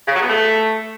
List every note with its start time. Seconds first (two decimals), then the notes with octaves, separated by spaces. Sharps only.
0.07 C#3
0.14 F#3
0.21 B3
0.28 A3